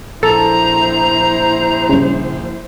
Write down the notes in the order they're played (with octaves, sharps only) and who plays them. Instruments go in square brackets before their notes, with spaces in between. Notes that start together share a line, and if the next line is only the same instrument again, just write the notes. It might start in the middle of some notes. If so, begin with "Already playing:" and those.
[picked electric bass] A#1 [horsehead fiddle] E4 C5 [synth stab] A4 [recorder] A#5
[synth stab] G2 C#3